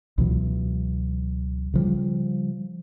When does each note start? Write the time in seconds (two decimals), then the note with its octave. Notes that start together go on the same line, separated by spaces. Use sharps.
0.18 C#2 B2 E3 F#3
1.74 C#3 F3 G3